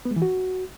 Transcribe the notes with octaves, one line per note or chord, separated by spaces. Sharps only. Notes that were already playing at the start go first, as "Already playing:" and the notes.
B3
G#3
E3
F#4